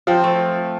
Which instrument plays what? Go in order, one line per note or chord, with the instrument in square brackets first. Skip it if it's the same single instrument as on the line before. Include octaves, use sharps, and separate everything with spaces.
[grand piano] F3 [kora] C4
[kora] A3